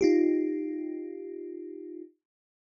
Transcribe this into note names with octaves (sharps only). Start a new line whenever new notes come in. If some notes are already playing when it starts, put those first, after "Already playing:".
D#4 F4 G4